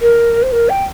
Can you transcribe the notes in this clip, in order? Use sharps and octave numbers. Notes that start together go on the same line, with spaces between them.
A#4
C5
A#4
G5